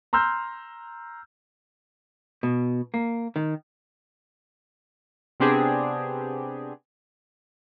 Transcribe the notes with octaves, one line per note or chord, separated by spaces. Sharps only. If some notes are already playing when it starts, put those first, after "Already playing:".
A#5 C6 E6 F6 G6
B2
A#3
D#3
C3 B3 C4 D4 G4 G#4